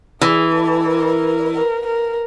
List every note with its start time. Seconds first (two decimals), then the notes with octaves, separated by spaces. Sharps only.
0.21 E3 G#4
0.55 A4
0.88 A#4
1.54 A#4
1.87 A#4